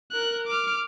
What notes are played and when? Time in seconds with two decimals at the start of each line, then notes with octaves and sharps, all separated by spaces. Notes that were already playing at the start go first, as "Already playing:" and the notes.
0.12 A#4 F#6
0.48 D6 F6